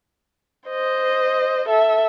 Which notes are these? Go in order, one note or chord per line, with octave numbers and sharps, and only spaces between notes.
C5 D#5
A4 E5